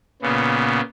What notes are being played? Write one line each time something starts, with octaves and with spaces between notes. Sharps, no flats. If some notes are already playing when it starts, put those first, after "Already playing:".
A#2 C#3 B3